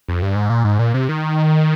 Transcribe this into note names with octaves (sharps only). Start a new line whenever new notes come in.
F2
G2
G#2
A#2
G#2
A#2
C3
D#3